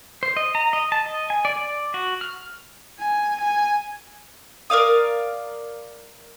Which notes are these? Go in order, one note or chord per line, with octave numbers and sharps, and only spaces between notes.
C5
D#5
A#5
D#5
A5
D#5
G#5
D5
D5
F#4
F6
G#5
G#5
A#4 D5 F5 D#6